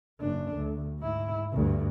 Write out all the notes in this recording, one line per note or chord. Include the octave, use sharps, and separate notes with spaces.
F#1 D4
D2
G#2 E4
D2 G2